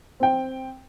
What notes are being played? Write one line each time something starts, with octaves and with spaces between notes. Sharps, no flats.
C4 G5